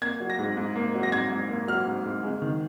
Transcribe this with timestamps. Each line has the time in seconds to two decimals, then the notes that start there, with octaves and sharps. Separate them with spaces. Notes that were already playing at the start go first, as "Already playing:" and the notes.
0.02 A#3 G#6
0.20 F#3
0.30 A#6
0.39 G#2
0.57 G#2
0.75 A#3
0.94 F#3
1.03 A#6
1.12 G#2 G#6
1.31 G#2
1.49 A#3
1.68 F#3 F6
1.86 G#2
2.04 G#2
2.23 G#3
2.42 D#3